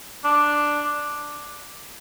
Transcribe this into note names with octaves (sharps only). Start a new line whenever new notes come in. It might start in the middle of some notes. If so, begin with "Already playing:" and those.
D4